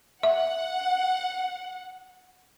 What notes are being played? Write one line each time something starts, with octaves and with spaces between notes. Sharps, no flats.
E5 F#5